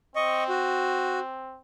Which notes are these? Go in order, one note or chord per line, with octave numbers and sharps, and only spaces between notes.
C4 D#5 C#6
F#4